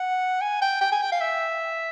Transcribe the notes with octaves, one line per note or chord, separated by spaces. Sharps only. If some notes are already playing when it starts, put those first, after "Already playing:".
Already playing: F#5
G#5
G5
G5
G#5
G5
F5
E5